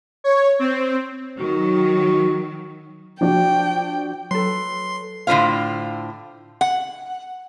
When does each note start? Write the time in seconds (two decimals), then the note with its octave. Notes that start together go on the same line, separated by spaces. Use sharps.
0.24 C#5
0.59 C4
1.40 D#3 F#3 F#4
3.21 F3 D4 F#4 G5
4.31 F#3 A4 B4 C6
5.27 A2 D3 A3 F4 C5 F5
6.61 F#5